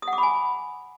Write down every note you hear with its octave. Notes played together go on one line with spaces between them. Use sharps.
D#6
F#5
D6
B5
G#5